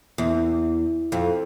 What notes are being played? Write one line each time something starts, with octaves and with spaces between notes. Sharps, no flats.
E2
F2